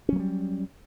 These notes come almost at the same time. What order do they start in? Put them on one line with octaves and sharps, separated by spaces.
C#4 F#3 A#3 G3